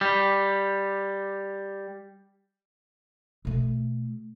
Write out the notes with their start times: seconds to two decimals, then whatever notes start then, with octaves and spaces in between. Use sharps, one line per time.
0.01 G3 G4
3.45 B2 A3